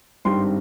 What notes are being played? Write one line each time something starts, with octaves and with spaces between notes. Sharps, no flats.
G#1 G2 D#3 G3 C4 C6